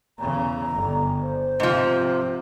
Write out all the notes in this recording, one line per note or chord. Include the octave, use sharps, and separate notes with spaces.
E2 C#3 A#5
G1
C5
G#2 C3 F3